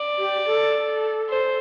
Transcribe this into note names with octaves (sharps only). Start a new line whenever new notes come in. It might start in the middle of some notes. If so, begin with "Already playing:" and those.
Already playing: D5
G4
A4
C5